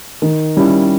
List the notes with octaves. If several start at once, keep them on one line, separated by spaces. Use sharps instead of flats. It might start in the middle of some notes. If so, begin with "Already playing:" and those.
D#3
G3 C#4 E4